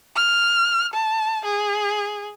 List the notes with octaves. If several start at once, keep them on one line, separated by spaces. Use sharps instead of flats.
F6
A5
G#4